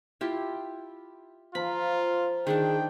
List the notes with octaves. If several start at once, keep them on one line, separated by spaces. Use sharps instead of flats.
E4 F4 G4
F3 F4 A#5 B5
D#3 D4 G#4 G5